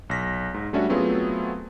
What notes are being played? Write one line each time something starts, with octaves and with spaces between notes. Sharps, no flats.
B1 A#6 B6
G#2
G3 A3 C#4 D4 F#4 E5
F#3 A3 B3 C4 F4 G#4